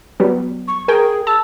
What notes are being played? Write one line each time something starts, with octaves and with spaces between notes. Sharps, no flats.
F#3 G3 B3
C#6
G#4 A#4 G5 G#5
A5 E6